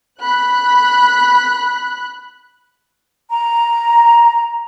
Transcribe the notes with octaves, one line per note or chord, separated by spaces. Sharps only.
B5 F#6
A#5